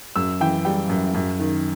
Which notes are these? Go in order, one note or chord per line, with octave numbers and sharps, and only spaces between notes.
F#2 E6
E3 G5
G3 G5
F#2
F#2
D#3